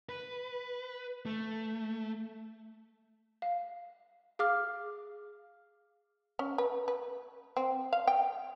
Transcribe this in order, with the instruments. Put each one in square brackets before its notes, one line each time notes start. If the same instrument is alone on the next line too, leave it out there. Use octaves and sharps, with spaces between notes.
[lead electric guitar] B4
A3
[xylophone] F5
G#4 F5 D6 F6
[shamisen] C#4
B4
B4
C4
F5
G5